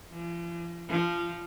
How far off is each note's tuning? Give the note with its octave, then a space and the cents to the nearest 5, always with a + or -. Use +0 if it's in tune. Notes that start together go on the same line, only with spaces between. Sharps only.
F3 -45
F3 -20